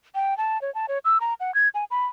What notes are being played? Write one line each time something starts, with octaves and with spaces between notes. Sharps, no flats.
G5
A5
C#5
A5
C#5
E6
A#5
F#5
G#6
G#5
B5